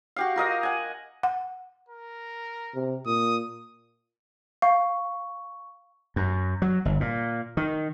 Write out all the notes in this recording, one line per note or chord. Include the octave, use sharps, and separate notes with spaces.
F#4 G4 F5
F4 A#4 D#5 F5
F#5 G#5
F#5
A#4
C3
A#2 D#6
F5 C#6
F#2
F#3
G1
A#2
D#3